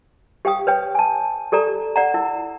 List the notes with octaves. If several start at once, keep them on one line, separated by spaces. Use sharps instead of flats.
G4 F5 G5 D#6
B4 C#5 G5
G#5 A5
G4 A4 D5 A#5
D5 F#5 A#5
E4 E6